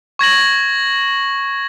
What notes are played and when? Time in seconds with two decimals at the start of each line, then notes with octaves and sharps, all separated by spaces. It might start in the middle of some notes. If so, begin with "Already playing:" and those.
0.19 C#6 G#6 A#6 F#7